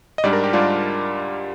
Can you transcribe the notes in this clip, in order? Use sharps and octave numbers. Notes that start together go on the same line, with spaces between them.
D#5
G#2 G3 D4 D5
A#4
G4
G#2 G3 D4 F4